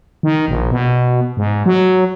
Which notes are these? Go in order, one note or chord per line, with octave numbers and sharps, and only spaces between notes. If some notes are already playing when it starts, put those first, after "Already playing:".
D#3
A#1
B2
G#2
F#3